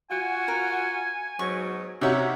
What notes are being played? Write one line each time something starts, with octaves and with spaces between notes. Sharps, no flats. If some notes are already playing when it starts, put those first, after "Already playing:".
F4 F#4 G#5
A#4
G#2 B2 F#3 C#6
C3 C#4 D#4 F#4 C#5 E5 F#5